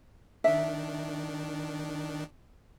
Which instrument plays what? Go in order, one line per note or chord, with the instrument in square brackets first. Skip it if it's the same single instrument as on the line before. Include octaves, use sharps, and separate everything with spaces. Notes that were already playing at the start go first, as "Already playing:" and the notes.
[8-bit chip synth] D#3 D4 [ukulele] E5